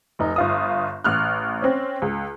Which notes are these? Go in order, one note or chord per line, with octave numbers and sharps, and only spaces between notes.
F1 D#4
G1 F4 D#6
A1 F6 F#6
C4 C#4
C#2